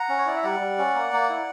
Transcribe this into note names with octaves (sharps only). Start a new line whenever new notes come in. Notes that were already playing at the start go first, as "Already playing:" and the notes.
Already playing: F#5 A#5
C#4
C#5
E4 D5
E5
G3 D5 F#5
G3
C#4
A#3
A#3
E4